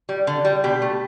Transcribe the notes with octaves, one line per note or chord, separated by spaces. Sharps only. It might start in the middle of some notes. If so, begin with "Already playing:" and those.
G3
D3
G3
B2 G4
A3